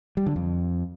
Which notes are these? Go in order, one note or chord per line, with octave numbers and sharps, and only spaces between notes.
G3
D3
F2